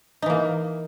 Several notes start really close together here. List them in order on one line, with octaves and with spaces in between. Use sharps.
D#4 E3 A#3